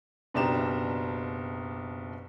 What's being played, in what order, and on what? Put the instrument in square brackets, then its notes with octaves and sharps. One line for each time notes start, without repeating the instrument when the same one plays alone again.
[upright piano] F#1 B2 D4 G4 A#5 E7